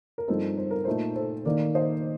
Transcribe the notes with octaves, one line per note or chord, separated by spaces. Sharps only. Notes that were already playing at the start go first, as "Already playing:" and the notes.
A#4
G2 F3 C4 D#4 A4
C5
A#4
A#2 A3 D#4 A4 C5
A4 C5
D#3 A#3 D#4 A#4 D5
C5 D#5